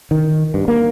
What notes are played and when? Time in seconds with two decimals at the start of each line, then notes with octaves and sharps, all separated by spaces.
0.11 D#3
0.54 G2
0.68 A#3